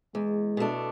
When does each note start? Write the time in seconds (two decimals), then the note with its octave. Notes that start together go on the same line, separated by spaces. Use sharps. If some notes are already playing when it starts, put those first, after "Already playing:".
0.15 E2 G#3
0.57 B2 A3 D4